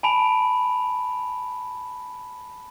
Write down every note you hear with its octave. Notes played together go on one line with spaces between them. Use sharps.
G#5 A5 B5 D7 F7